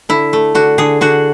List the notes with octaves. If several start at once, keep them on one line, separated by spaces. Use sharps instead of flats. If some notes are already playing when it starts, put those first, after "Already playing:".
D3 E4
A3
D3 F#4
D3 G#4
D3 F#4